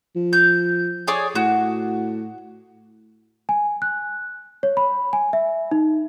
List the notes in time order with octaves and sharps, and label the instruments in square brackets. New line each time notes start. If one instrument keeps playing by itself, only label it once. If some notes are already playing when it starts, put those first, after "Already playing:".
[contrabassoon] F3
[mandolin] G6
G#4 C#5 D5
[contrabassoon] A2 [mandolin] F#4
[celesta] G#5
F#6
C#5
B5
G#5
E5
D#4